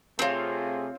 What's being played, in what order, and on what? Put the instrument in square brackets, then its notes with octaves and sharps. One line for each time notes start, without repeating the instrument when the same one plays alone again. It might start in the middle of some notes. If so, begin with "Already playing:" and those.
[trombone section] C3 A3 G#4 [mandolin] C4 F4 [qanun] C5 C#5 F5